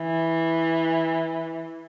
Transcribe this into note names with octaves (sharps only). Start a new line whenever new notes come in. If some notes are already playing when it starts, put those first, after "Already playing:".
Already playing: E3